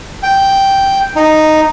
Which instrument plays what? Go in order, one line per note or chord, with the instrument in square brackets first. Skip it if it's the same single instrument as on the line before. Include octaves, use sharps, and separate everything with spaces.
[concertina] G5
D#4